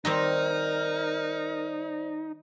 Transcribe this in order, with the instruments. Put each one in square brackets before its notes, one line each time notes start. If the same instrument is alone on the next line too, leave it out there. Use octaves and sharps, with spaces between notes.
[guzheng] D#3 G3 C4 [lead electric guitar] D#4 [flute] A#4 [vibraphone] C5 D5